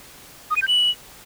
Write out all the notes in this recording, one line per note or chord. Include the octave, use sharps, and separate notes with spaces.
D#6
D#7
G6
F#7